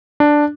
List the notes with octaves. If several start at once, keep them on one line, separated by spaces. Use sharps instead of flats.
D4